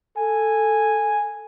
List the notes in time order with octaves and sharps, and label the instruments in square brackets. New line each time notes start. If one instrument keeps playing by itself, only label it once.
[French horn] A4 [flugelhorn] G#5